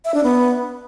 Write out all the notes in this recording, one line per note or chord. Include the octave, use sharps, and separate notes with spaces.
E5
D4
B3